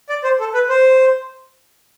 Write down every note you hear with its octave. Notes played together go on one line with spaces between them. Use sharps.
D5
C5
A4
B4
C5